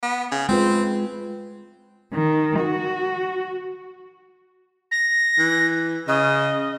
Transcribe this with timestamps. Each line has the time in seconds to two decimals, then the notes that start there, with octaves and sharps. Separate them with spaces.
0.03 B3
0.31 C#3
0.49 G#3 C4 F4 B4
2.13 D#3
2.60 F#4
4.92 A#6
5.39 E3
6.08 C#3 D#5